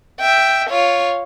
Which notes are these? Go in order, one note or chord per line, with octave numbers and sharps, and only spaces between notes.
E5 G5
F4 C#5